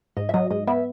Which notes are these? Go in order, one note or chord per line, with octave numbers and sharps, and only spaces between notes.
G#2 D#5
E5
F#3 D#5
G#2 D#5
B3 E5